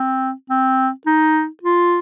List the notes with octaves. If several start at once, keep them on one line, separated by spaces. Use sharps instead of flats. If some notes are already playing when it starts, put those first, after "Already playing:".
Already playing: C4
C4
D#4
F4